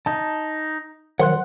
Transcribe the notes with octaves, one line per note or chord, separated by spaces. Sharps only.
D#4 A5
D#3 F3 F#3 F#5 C6 F#6